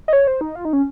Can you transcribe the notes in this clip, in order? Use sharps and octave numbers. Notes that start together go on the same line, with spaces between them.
D#5
C#5
C5
D#4
F4
D#4
C#4